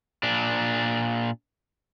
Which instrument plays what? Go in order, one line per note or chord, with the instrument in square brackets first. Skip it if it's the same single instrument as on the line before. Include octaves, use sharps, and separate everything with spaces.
[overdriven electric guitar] A#2 D4